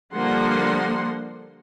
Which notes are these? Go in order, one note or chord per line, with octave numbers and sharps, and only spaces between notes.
D3 F3 G3 A#3 F#5 C6